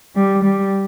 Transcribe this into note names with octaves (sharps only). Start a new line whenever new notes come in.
G3
G3